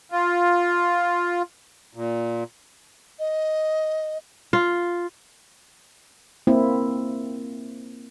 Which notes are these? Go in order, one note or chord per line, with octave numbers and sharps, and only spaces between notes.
F4
A#2
D#5
F4
A#3 C4 E4